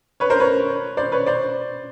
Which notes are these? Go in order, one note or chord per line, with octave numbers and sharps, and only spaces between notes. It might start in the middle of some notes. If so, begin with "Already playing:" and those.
B4 C#5
A#4 C5
B4 C#5
C5 D5
B4 C#5
C5 D5